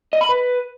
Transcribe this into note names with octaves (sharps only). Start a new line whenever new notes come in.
D#5
B5
B4